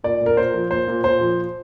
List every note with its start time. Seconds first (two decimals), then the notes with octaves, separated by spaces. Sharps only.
0.04 A#2 D5
0.21 A#2
0.26 A#4
0.37 A#2 C5
0.54 F3
0.71 A#2 C5
0.88 A#2
1.04 A#2 C5
1.21 F3